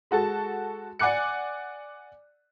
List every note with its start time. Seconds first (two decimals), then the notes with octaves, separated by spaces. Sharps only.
0.11 G#3 F#4 A4 A5
0.99 D5 F#5 G#5 D6 F#6 C#7